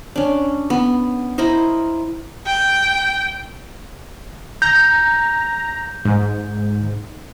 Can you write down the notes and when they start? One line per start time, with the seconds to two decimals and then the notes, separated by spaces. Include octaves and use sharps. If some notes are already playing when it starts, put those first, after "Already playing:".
0.16 C#4 D4
0.70 B3
1.38 E4 A#4 C5 D#5
2.46 G5
4.62 A#5 G6
6.05 G#2